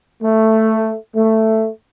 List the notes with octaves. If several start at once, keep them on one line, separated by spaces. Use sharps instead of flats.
A3
A3